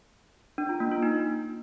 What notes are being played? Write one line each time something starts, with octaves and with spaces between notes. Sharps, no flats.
D4
F4
A#3
F4
D#4